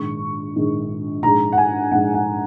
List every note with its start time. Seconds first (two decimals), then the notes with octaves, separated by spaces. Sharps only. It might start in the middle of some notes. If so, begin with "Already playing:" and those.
Already playing: A#1 G#2 D#3 G#3 C#6
0.56 A#1 G#2 D#3 G#3
1.23 A#1 G#2 G#3 A#5
1.53 F#5
1.58 G#5
1.91 A#1 G#2 G#3 F#5
2.14 F#5